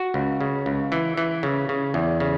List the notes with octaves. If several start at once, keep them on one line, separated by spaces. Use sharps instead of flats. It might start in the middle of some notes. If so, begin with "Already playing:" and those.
Already playing: F#4
C#2
C#3
C#2
E3
E3
C#3
C#3
E2
C#3